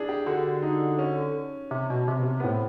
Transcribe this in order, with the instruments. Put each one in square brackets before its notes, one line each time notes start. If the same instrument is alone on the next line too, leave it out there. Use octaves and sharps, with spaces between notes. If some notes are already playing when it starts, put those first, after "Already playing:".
Already playing: [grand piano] D4 E4 G#4
G4
[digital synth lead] D3 [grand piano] F#4
[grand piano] D#4
C#4
[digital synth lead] C3
B2
C3
B2
C3
[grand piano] B3
[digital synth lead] A2 [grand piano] C4